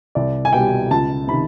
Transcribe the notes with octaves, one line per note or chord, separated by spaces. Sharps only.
C2 D5
G#5
B2 G3 G5
C#2 A5
C3 D#3 B5